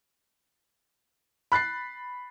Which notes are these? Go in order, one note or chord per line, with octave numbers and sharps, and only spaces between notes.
B5 F#6 A6 C7